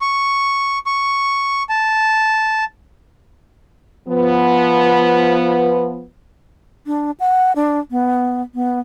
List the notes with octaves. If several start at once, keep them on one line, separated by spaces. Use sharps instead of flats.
C#6
C#6
A5
F3 B3
D4
F#5
D4
B3
B3